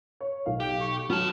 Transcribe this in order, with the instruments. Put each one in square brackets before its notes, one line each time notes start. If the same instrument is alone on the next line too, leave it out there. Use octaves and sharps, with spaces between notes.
[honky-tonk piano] C#5
B1 F5
[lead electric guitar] G4 [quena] G5
[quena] C#6
[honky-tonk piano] F#3 [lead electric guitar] B3 A5 [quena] F6